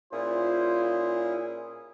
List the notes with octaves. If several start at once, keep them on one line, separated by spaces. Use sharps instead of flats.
A#2 C#4 E4 F4 G#4 C5